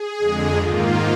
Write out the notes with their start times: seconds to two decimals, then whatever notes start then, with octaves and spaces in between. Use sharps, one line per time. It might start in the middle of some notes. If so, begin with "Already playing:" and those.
Already playing: G#4
0.19 F2 D3 G#3
0.55 G#2 D#3 A#3 F4